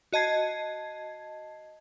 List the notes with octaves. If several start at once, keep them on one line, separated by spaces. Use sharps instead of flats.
F#4 D#5 A5 G#6 C7